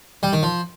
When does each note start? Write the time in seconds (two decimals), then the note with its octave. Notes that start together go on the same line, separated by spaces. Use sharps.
0.23 G3
0.33 D#3
0.43 F3